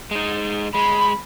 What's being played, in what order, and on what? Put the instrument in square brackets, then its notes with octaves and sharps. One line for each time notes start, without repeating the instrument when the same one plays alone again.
[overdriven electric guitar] G#3 D#4
[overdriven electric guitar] G#3 [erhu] B5